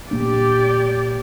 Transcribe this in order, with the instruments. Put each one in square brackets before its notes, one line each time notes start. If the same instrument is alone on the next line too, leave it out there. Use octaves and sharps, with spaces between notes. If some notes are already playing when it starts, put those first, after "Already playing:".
[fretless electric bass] A#2 A#3 D4 [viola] G4 D5